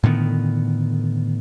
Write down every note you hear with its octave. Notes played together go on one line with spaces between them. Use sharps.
A2 D3 D#3 B3